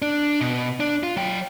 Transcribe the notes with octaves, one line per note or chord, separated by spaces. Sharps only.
D4
B2
D4
F4
F#3 G5